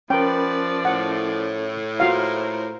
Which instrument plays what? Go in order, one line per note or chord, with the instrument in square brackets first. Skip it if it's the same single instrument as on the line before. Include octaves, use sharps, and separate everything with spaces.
[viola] F3 D5 [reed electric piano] C#4 A#4 [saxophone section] B4 [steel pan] G5
[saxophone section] A2 [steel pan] F#5
[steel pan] F4 F#4 F5 [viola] A#4 C5